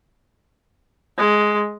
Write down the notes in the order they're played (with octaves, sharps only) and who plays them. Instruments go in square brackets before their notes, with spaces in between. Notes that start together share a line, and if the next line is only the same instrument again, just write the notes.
[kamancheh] G#3